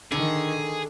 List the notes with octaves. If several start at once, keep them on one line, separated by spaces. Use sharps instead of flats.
D3 D#3 G#4